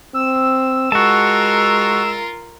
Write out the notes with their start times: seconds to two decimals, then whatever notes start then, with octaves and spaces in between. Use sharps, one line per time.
0.14 C4 E6
0.92 G#3 F4 F#4 A#4 A5